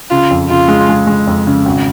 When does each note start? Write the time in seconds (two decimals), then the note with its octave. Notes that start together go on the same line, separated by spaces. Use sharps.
0.10 C#3 F4
0.31 F2
0.49 C#3 F4
0.68 G#3
0.89 G#3
1.07 G#3
1.27 F2
1.47 C#3
1.66 G#1